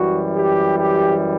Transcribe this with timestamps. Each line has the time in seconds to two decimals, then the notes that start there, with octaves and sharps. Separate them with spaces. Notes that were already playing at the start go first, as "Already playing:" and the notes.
Already playing: F#2 E3 G3 F#4
0.35 G4
0.77 G4